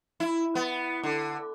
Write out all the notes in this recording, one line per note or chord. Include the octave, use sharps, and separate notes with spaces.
E4
B3
D3